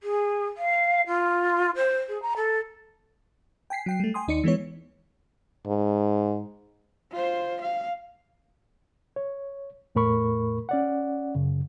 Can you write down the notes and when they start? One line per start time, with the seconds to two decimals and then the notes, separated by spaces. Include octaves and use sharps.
0.02 G#4
0.56 F5
1.06 F4
1.75 C5
2.08 G#4
2.22 A#5
2.36 A4
3.70 G5 G#5 B6 C7
3.86 F#3 G5 C7
4.00 G3 A3
4.14 G5 G#5 C6 D#6
4.28 D#2 D#4 D5 C#7
4.44 E3 G#3 B3 C#5
5.67 G#2
7.12 F4 C5
7.61 F5
9.16 C#5
9.95 E2 A2 A3 A#4 B5 C#6
10.69 C#4 D5 F#5
11.35 F#2 C#3